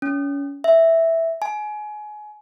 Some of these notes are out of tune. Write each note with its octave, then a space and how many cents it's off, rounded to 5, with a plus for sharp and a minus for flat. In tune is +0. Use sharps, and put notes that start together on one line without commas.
C#4 +30
E5 -5
G#5 +25